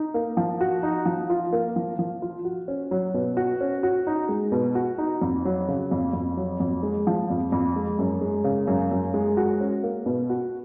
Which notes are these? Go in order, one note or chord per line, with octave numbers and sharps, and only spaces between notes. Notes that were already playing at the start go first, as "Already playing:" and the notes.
Already playing: D#4
A#3
F3
F#4
D#4
F3
F4
A#3
F3
F3
F4
F#4
C#4
F#3
B2
F#4
C#4
F#4
D#4
G#3
B2
F#4
D#4
F2
F#3
C#3
F2
F2
F#3
F2
G#3
F3
F2
F2
G#3
F#2
G#3
C#3
F#2
F#2
G#3
F#4
C#4
A#3
B2
F#4